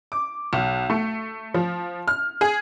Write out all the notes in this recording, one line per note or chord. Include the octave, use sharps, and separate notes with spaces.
D6
B1
A3
F3
F6
G#4